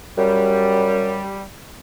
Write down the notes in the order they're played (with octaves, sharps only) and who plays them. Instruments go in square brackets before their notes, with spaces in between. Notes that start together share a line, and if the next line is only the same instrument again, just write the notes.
[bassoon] F#2 [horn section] G3